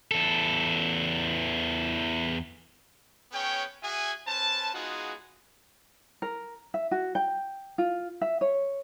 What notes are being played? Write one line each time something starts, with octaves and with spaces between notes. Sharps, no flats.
E2 A4
B3 C#4 G#4 C#5 G5
F#4 G#4 E5 G#5
C#4 B4 C5 A5
G#3 B3 D#4 F4 F#4 G#4
A#4
E5
F#4
G5
F4
E5
C#5